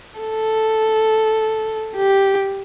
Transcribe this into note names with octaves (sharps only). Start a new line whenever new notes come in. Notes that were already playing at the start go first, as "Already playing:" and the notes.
A4
G4